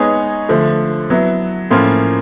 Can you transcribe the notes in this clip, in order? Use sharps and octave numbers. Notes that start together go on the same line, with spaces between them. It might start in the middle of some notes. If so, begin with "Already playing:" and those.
Already playing: G#3 B3 D#4 G#4 C#5
D3 F3 A3
F#3 B3 E4
A2 F3 A#3 C#4 F4